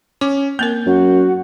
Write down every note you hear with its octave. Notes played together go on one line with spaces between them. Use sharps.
C#4 D6
A#3 C4 A#4 G6
F#2 F#4